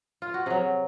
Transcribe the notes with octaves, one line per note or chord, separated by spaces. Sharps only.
F4
F#4
C3 F#3 G#4